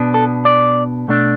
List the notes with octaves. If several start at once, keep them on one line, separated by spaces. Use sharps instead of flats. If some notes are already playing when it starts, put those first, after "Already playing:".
Already playing: B2 B3 D4
A4
D5
B2 A3 D4